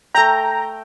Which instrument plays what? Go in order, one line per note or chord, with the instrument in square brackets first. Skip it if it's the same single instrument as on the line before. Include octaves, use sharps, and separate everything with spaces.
[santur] A3 G5 [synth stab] A#5